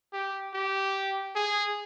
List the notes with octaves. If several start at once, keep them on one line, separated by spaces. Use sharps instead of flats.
G4
G4
G#4